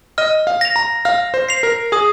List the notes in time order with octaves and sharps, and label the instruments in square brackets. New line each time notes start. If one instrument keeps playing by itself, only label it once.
[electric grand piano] D#5 [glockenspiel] F6
[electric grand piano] F5
[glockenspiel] A#6 F7
[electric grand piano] A#5
[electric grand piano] F5 [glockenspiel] F6
[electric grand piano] C5
[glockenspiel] C7 F7
[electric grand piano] A#4
[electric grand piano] G#4 [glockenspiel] D#6